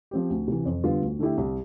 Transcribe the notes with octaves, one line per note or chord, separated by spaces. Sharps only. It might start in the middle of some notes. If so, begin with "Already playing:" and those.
F3 C4 G4
D2
C3 E3
F2
D3 G3 B3 F4
D2
D3 A3 E4 G4
C2